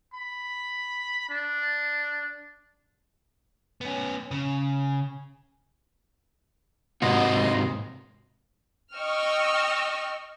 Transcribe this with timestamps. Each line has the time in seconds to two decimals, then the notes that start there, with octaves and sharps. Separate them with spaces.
0.14 B5
1.29 D4
3.81 B3 C#4
4.31 C#3
7.02 G#2 C3 F#4 D#5 C6
8.94 D#5 G5 C#6 E6 F6